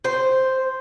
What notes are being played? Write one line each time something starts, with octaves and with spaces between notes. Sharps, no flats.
C5